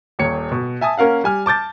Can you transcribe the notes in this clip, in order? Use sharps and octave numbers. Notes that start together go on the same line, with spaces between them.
D#1 D#2 C#5 C#7
B2
E5 G#5 A5 D#6
A#3 C#4 A#4 F5 F#5
G3 G#5 F6
A5 D6 G6 A6